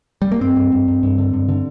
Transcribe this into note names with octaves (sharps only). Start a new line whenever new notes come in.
G3
A#3
G2 C4
G2
G2
G2
G2
D3
G2
D3